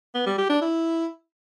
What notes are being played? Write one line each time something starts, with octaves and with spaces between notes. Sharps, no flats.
B3
G3
G4
D4
E4